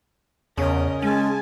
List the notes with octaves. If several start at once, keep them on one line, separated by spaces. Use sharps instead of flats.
E2 C#3 A#4 D#5
G#3 C#4 G#5 A5